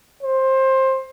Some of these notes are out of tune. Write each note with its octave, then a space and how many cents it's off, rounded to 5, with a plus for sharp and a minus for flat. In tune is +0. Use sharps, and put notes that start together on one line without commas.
C5 +20